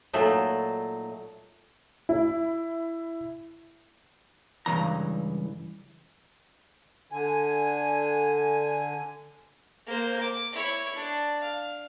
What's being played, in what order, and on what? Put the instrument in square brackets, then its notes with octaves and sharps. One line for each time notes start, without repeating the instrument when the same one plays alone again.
[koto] A#2 F#3 A3 D#4
[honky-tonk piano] E4
[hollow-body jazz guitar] C#2 G2 E3 A#5
[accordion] D3 G#5
[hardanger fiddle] A#3 C5
D6
E4 C#5
D4
F5